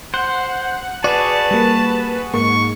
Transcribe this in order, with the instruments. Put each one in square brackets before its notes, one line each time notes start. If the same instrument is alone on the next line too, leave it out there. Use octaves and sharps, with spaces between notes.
[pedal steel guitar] C5 [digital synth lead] F#5
[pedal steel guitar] F#4 G#4 [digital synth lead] B4 [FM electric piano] D5 [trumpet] A5
[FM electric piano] G3 A#3
[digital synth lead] G#2 [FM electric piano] A#3 [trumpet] C#6